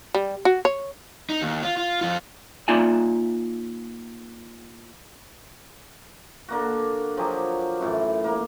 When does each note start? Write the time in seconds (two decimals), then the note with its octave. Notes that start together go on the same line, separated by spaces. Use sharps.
0.14 G3
0.45 F#4
0.65 C#5
1.30 D#4
1.42 D#2
1.63 F4
1.77 F4
2.01 F2 F4
2.68 A#3 D#4 F4 D5 E5 G#5
6.48 D3 A#3 F#4
7.17 F3 F#3 G4 G#4
7.80 F#2 A2 E3
8.24 A#3